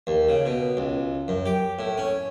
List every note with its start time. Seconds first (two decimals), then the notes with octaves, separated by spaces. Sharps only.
0.07 D#2
0.29 C#3
0.46 B2
0.77 C#2
1.28 F#2
1.46 G4
1.79 A2
1.98 C#4